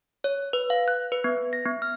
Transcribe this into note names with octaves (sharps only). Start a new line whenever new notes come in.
C#5
B4
F5
F#6
B4
B3
A#6
B3
F6